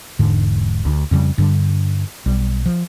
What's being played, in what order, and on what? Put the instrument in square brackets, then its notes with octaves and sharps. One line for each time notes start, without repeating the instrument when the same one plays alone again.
[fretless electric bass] E1 G#2 D3
D2
F2 C#3 F#3 G3
G2 D3 G3
B1 G3
F3